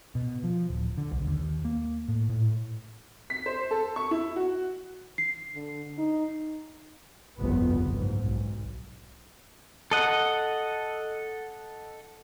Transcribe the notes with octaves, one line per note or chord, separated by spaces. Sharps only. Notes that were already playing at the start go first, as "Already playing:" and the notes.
B2
F3
D1
D3
B1
D#2
A#3
A2
A2
B6
C5
A4
C#6
E4
F#4
C7
D3
D#4
G1 C2 F2 A#2 C#3 B3
F#1 G#2
B1
A4 D#5 F#5